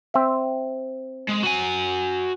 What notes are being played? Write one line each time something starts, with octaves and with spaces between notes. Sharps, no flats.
C4 E5
G#3
F#4 G#5